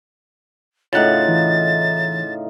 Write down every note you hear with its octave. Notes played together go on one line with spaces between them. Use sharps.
A2 C#3 D#4 F4 F#5 A6
E3